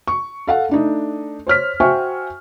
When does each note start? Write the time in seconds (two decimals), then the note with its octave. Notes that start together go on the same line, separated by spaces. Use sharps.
0.08 C#6
0.47 A4 F5 F#5
0.69 A3 D4 D#4
1.47 C5 C#5 F6 B6
1.80 F#4 C5 E5 G5 G#5 C#6